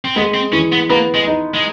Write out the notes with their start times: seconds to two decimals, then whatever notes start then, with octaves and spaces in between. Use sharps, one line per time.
0.05 C4
0.15 G#3 B3
0.34 C4
0.52 E3 C#4
0.72 B3
0.90 A#3 B3
1.14 G#3
1.27 D#4
1.54 G#3